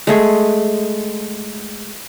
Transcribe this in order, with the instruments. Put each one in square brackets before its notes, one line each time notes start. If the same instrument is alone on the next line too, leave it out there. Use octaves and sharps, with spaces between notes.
[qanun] G#3 A3 G#4